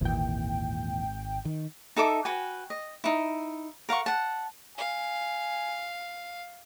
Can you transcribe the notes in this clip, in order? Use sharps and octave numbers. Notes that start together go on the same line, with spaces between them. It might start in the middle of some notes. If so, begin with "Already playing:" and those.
G#1 D#2 A#2 E3 G5
D#3
D#4 A4 E5 D6
F#4 B4 G5 G#5
D#5
D#4 E4
A#4 F5 F#5 C#6
F#5 A5
F5 G#5